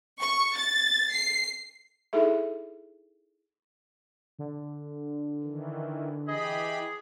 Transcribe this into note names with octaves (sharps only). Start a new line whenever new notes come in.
C#6
A6
C7
D#4 E4 G#4 A4 E5
D3
D#3 E3
E3 G4 G#4 D#5 B5